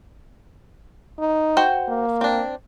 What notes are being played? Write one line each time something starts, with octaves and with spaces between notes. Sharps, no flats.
D#4
F#4 C5 G5
A#3
C4 D4